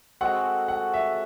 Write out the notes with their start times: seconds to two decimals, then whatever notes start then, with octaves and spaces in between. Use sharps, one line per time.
0.21 G#3 C4 F#4 A4 F#5
0.68 F#5
0.94 E5